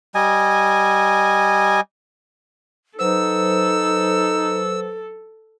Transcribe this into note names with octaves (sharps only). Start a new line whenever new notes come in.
G3 D#5 G#5
F#3 D#4 A4 B4 C5 E6